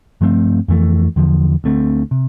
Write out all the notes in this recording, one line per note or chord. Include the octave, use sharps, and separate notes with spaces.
G2 F3 A3 C4
F2 E3 A3
E2 D3 F3
D2 D3 A3 C4
C3